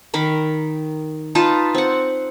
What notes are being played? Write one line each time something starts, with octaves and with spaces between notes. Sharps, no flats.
D#3 A#4 B5
D#4 F4 B4 A5
C4 F#5